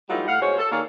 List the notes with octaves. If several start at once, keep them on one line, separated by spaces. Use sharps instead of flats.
E3 F#3 G3 A3 D#4 F4
A2 F5 F#5
B2 G#3 C5 C#5
A4
D#3 A#3 G#4 C#5 D5 F5